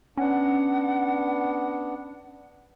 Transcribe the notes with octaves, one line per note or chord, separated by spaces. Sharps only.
B3 C#4 D4 F#5